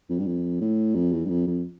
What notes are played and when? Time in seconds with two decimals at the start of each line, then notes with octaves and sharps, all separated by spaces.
0.09 F2
0.19 G2
0.26 F2
0.61 A2
0.95 F2
1.12 E2
1.25 G2
1.29 F2
1.47 F2